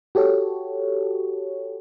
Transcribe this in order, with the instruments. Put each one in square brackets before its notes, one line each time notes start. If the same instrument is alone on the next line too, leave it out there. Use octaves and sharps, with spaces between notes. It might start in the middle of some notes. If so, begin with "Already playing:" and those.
[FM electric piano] F#4 G4 A4 C#5